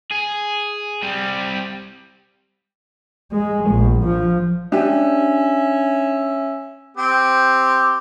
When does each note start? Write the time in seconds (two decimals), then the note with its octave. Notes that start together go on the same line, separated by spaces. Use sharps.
0.12 G#4
1.03 G3 C4
3.32 G#3
3.71 A#1
4.04 F3
4.72 C#4 D4 G4 E5
6.97 C4 G4